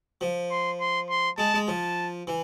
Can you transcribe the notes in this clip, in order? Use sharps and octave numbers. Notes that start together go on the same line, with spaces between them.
F3
C6
C6
C6
G#3 A5
G#3
F3 A5
E3